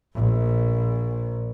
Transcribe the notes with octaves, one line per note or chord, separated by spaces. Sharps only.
A#1